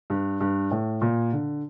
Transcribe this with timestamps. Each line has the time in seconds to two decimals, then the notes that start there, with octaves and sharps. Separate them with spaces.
0.10 G2
0.40 G2
0.71 A2
1.02 A#2
1.33 D3